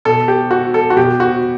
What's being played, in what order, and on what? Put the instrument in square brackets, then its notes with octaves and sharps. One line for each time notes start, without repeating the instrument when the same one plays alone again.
[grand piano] B2 A4
G4
F#4
A4
F#4
B2 G4
F#4